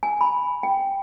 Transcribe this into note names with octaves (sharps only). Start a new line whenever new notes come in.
G#5
B5
G5